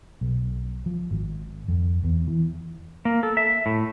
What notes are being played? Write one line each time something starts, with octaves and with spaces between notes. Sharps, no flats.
B1
F3
G#1
F2
E2
E3
A#3
A4
E5
A2